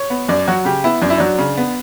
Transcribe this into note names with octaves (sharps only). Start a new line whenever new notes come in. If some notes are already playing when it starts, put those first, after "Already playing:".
Already playing: C#5
B3
F#2 D5
F#3 F#4
C#3 G4
B3 E4
F#2 D4
E4
F#3 D4
C#3
B3